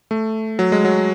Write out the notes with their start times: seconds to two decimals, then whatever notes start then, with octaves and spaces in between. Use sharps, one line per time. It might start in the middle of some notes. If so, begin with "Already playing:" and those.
0.11 A3
0.59 F#3
0.72 G#3
0.85 F#3